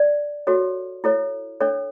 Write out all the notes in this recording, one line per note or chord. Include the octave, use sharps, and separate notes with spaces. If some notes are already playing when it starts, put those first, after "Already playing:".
Already playing: D5
F#4 A4 C#5
E4 A4 C#5
D4 A4 C#5